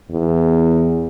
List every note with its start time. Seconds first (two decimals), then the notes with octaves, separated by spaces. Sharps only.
0.11 E2